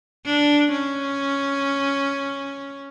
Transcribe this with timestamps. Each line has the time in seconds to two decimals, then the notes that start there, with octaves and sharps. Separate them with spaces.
0.26 D4
0.72 C#4